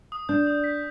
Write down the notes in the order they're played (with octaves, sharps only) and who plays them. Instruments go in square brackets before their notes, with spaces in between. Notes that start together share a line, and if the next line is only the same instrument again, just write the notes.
[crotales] D#6
[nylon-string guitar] D4 [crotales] G6
[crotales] D#6
B6